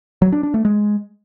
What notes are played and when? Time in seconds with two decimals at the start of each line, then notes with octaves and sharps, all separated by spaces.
0.22 F#3
0.32 D4
0.43 D4
0.54 A3
0.65 G#3